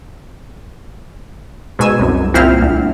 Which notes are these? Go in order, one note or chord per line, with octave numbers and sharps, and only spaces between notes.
G#2 B2 G#5 E6
C2 F#2
C2 A#2 C4 E4 C5 F6
D2